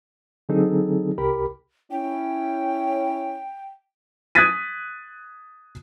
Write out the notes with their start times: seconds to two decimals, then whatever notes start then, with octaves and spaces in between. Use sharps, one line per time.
0.49 D3 F#3 C4 D#4 G#4 A4
1.18 C2 G4 A#4 B5
1.91 C#4 E4 G5
4.35 D#6 F#6 G#6 A6 B6 D#7